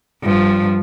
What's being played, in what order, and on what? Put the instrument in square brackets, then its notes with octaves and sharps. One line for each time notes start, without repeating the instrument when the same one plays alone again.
[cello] G2 F3